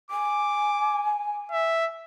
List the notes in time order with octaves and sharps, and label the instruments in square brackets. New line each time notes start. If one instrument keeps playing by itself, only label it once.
[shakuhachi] G#5 [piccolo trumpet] D6
[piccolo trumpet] E5